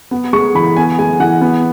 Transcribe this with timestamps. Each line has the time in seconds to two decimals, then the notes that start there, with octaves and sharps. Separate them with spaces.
0.11 B3
0.33 G#3 C#6
0.55 E3 B5
0.77 B3 G#5
0.98 G#3 G#5
1.20 E3 F#5
1.41 B3